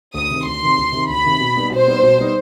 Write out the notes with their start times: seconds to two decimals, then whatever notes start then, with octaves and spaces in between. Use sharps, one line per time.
0.14 D2 D#6
0.31 C3 D#3
0.45 D2 C6
0.61 C3 D#3
0.77 D2
0.92 C3 D#3
1.09 D2 B5
1.24 C3 D#3
1.40 B2
1.56 G3 B3 D#4
1.71 B2 C5
1.87 G3 B3 D#4
2.03 B2
2.18 G3 B3 D#4